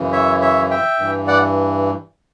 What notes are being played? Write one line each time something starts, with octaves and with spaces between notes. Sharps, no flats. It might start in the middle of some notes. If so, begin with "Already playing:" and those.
Already playing: F#2 C#3 E3
C#5 E5
C#5 E5
E5 G5
G2 E3
D5 F#5